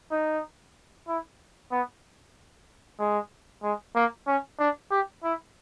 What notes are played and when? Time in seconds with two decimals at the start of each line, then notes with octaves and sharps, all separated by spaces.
0.11 D#4
1.08 E4
1.72 B3
2.99 G#3
3.63 G#3
3.95 A#3
4.27 C#4
4.59 D4
4.91 G4
5.24 E4